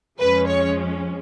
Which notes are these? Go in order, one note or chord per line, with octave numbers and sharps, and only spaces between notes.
F2 F3 G#3 C#4 B4
C#5